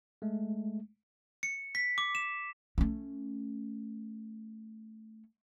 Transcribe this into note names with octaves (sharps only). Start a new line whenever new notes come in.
G#3 A3
C#7
B6
D6
E7
A3 C#4